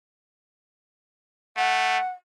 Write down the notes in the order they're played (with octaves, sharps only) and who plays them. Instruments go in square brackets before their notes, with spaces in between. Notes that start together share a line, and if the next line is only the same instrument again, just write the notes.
[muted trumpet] A3 [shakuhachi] F#5